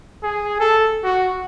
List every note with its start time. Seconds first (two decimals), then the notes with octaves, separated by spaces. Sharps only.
0.23 G#4
0.60 A4
1.04 F#4